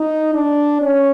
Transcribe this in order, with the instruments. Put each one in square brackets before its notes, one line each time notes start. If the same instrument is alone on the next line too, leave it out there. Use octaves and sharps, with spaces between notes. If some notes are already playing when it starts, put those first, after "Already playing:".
Already playing: [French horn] D#4
D4
C#4